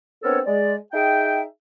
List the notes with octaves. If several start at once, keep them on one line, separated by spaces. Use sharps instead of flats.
B3 C4 D4 A4 A#4 C#5
G#3 D5
D#4 G#4 E5 G5